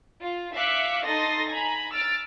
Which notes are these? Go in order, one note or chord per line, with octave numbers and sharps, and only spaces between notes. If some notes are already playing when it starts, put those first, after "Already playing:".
F4
E5 F5 D6 F#6 B6 C#7
D#4 A4 C6 D#6 A6 A#6
G#5 A#5 B5
E6 F6 A6 D7